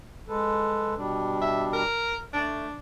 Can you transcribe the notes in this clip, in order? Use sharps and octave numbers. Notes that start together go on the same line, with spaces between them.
G#3 A4 B4
B2 G3 D4
E5
A#4
A3 D4